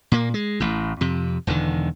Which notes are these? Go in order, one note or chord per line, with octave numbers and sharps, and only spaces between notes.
A#2 A#3
G#3
A1 A2
F2 C3
E1 E2 D3 D#3